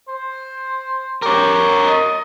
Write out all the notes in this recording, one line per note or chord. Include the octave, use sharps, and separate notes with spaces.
C5
G4 A#4 C#5
D#5